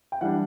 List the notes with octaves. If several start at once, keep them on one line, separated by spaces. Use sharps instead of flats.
G5
E3 G3 D4 F#5